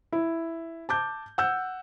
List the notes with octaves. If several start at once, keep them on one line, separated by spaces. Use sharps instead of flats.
E4
A5 D6 G6
F#5 E6 G6